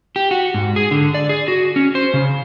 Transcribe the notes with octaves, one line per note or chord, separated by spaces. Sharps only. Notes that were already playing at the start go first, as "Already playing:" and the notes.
G4
F#4
G#2
G#4
D3
D5
G#4
F#4
C#4
C5
C#3